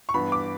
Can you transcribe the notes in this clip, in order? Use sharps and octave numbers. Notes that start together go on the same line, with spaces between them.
C#6
G2 E3 B3 B5
D6